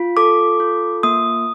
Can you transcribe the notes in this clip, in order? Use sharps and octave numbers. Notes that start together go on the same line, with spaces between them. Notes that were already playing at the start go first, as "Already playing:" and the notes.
Already playing: F4
A4 D6
F4
A#3 D#6